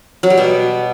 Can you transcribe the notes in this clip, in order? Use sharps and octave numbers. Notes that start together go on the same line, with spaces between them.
F#3
G3
B2